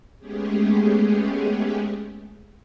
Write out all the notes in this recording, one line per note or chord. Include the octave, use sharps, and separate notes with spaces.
G#3 A3 B3 C#4 G4 G#4